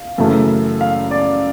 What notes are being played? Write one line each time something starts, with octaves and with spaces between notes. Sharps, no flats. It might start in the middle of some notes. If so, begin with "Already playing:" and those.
Already playing: F5
F#2 C#3 E3 A3
F5
D5